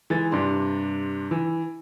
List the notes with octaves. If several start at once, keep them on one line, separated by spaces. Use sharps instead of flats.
E3 G#3 G#5 A6
G2 C3 D4 C6
E3